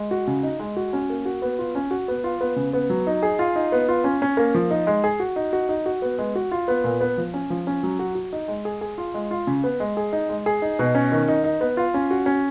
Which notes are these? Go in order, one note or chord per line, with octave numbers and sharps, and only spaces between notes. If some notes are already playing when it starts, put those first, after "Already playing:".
Already playing: G#3
F#4
C#3
D#4
G#3
F#4
C#4
A#3
F#4
B3
F4
C#4
F#4
B3
F4
B3
C#3
B3
F#3
D#4
G#4
F4
D#4
B3
F4
C#4
C#4
A#3
F3
D#4
G#3
G#4
F#4
D#4
F#4
D#4
F#4
B3
G#3
F#4
F4
B3
A#2
B3
F3
C#4
F3
C#4
F#3
F#4
F#4
D#4
G#3
G#4
G#4
F4
G#3
F4
C#3
B3
G#3
G#4
D#4
G#3
G#4
D#4
B2
C#4
D#3
D#4
D#4
B3
F4
C#4
F#4
C#4